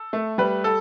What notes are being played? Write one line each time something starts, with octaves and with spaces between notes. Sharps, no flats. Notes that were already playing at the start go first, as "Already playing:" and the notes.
Already playing: A4
A3
G3 B4
A4